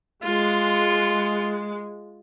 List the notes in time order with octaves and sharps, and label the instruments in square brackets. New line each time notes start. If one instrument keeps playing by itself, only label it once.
[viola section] G#3 [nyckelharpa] F4